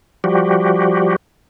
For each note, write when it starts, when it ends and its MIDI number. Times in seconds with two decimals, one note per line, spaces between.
0.24 1.16 53
0.24 1.16 55
0.24 1.16 66
0.24 1.16 67